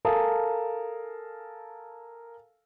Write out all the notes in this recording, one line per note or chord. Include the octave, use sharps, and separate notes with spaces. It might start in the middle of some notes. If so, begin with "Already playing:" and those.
A4 A#4 F5 G#5 A5 D#6